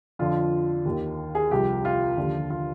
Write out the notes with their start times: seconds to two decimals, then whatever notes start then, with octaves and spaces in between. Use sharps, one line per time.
0.19 F2 D3 F3 F4
0.85 D#2 D#3
1.35 G#4
1.51 C2 C3 F3 G4
1.85 F4
2.17 D#2 D3 F3
2.50 F4